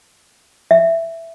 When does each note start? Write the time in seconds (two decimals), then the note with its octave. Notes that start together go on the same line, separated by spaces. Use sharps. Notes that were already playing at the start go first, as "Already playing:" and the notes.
0.71 E5